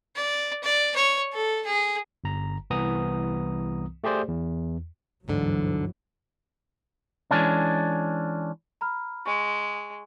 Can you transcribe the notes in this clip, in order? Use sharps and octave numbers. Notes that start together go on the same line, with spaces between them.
D5
D5
C#5
A4
G#4
G1 A#5
C2 E3 B3 A#5 D#6
A3 G4 G#4 C5 D5
E2
G1 D2 G#2 D3 E3 F#3
E3 G#3 C#4 D4
A#5 B5 F6
G#3 C#6